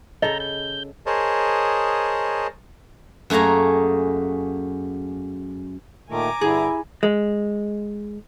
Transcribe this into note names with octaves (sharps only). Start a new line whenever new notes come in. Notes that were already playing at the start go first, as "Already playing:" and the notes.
C#3 A4 D#5 A#5 G6
G6
G#4 A#4 C5 C#5 D#5 A5
F#2 A3 A#3 G#4 A#5
A#2 D#3 A3 G#5 A#5 D6
G2 D3 E4 G#4
G#3